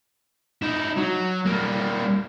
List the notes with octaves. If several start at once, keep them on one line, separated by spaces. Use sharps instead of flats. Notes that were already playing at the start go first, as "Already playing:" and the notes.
D#4 E4
F#3
G3 A#3